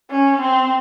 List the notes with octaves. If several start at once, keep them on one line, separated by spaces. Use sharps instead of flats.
C#4
C4